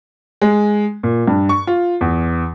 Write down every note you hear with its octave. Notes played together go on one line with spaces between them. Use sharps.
G#3
A#2
G2
C#6
F4
E2